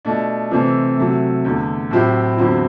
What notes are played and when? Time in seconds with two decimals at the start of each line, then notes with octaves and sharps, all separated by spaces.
0.05 B2 A3 D4
0.51 C3 E3 A3 C4
0.98 C3 F#3 A3
1.45 E2 D3 A3
1.91 A2 F#3 C4 E4 G4
2.37 E2 D3 F#3 C4 E4